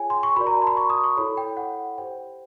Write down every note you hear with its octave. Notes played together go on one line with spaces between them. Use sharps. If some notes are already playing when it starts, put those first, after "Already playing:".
Already playing: F4 G#4 C#5 G5 G#5
C6
C#6
F#4 A#4 D5 B5
A#5
A5
C6
B5
C#6
D#6
C#6
E4 A4 C#5 B5
G5
F#5
G4 C5 G5